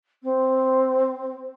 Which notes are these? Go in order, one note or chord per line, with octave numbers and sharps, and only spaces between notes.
C4